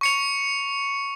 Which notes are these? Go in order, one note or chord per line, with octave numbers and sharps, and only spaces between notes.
C#6 C#7 F7